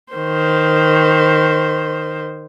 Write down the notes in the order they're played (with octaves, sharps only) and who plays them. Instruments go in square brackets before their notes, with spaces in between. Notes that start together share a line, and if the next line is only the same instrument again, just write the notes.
[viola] D#3 C5